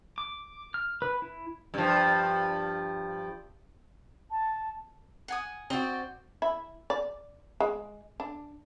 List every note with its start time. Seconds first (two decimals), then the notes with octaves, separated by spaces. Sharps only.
0.18 D6
0.74 F6
1.02 B4
1.22 E4
1.74 G2 F3
4.30 A5
5.28 F#5 G#5 D#6
5.70 C4 F#4 D5 D#5
6.42 E4
6.90 D5
7.60 G#3
8.20 D4